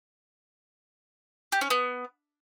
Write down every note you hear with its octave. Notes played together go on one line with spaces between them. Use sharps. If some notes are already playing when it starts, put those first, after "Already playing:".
G4
C#4
B3